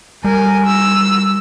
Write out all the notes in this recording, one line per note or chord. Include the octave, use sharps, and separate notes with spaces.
G3 A#4 G#5
E6